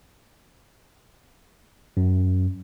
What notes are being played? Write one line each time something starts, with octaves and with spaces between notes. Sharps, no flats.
F#2